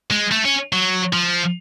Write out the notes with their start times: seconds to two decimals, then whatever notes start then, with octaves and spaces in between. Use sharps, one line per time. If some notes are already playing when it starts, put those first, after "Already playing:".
0.11 G#3
0.32 A3
0.45 C#4
0.73 F#3
1.13 F3